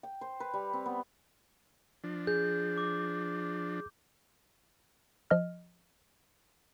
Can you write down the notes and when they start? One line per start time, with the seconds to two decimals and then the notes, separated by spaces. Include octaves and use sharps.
0.03 G5
0.21 C5
0.40 B4
0.54 G3
0.73 C4
0.86 B3
2.04 F3 D4
2.27 G#4 G6
2.78 D6
5.31 F3 D#5 F6